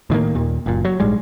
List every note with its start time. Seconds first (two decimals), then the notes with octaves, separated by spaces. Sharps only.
0.10 A2 D#3 A3 A#3
0.35 D#2 A#2
0.66 F#1 A#2
0.85 F#3
1.00 A#1 G#2 G3 G#3